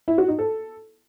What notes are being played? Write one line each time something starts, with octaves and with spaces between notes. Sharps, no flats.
E4
F#4
D#4
A4